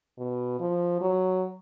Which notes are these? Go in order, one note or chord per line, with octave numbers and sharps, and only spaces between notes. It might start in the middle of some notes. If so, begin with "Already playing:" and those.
B2
F3
F#3